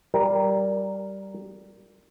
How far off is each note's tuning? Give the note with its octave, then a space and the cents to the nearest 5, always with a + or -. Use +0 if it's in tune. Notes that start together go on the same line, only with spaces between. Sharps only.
G3 -10 A#4 +0